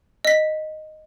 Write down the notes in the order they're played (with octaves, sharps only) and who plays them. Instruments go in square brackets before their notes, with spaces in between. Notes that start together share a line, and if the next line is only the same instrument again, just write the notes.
[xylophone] D#5 B6